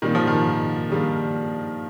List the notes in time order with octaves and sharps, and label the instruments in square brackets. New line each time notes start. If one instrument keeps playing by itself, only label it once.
[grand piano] A#2 G3 A#3 D#4 [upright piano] D#3
[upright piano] F3
D#3
[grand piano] D#3 G3 A#3 D4